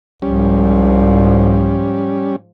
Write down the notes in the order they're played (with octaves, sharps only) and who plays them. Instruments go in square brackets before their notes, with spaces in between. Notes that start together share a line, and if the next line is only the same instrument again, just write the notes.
[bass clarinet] C2 [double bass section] G#2 F3 [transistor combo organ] G3 C#4